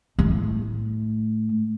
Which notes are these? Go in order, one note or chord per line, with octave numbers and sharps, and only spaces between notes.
A2 A3